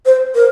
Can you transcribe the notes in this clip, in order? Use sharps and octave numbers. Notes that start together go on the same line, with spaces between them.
C5
A#4